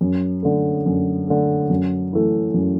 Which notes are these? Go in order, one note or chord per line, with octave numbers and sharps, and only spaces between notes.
F#2
D3 A3
F#2
D3 A3
F#2
E3 A3
F#2